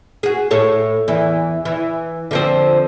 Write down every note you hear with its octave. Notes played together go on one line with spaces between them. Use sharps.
F#4 G#4
A2 A4 C#5
E2 E3
E3
D3 F3 C4